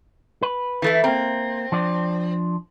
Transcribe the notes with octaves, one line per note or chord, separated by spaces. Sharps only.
B4
E3 A3 E4
A#3 C4 A#4
F3 D4 D5